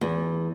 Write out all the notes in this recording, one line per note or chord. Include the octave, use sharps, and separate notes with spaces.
E2